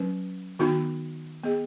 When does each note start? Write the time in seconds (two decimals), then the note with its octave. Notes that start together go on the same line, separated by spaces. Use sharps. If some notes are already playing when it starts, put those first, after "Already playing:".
Already playing: F#3 C#4 B4
0.59 D#3 B3 D#4 F#4
1.44 B3 G#4 D#5